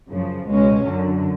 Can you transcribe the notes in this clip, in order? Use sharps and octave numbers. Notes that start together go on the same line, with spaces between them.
F#2 C#3 F3
C#2 B2 G#3 C#4
F#2 D3 F#3